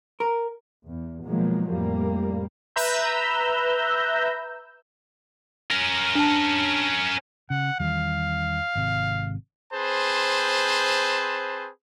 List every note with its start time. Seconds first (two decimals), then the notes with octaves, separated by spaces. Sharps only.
0.20 A#4
0.85 E2
1.26 B2 D#3 F3 F#3 G#3 A#3
1.69 F2 A2 G3 A#3
2.76 B4 E5 A#5 E6 G6
5.71 C#4 A#4
6.15 D4 A5
7.50 C#3 F#5
7.80 E2 D#3 G3 F5
8.75 G#1 C3
9.73 C4 G#4 B4 C5 A5